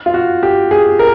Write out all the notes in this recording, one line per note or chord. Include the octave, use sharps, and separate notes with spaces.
F4
F#4
G4
G#4
A#4